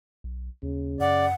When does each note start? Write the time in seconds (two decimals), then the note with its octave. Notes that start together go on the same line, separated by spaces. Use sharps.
0.24 B1
0.63 D#2 C#3
1.01 F#2 D5 F#5